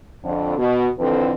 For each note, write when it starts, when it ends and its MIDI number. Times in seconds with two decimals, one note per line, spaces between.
0.24 0.57 41
0.24 0.57 50
0.58 0.88 47
0.99 1.32 41
0.99 1.32 50
0.99 1.32 52
0.99 1.32 60
0.99 1.32 69
0.99 1.32 71